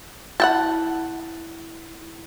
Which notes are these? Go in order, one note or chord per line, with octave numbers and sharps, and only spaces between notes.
E4 F#5 G5 A5